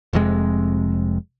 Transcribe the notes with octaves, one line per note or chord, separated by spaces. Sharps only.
F1 F2 C3 G#3